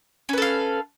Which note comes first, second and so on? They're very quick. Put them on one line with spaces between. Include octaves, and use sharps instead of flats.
C#4 B4 A4 F5